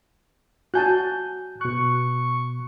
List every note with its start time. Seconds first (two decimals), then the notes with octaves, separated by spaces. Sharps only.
0.74 F#4 G#5 A5 F#6 G6
1.61 B2 C#6 F#6